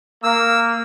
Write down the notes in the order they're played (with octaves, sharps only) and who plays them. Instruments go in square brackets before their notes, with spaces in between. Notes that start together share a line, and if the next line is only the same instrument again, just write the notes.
[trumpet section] A#3 [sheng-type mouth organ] E6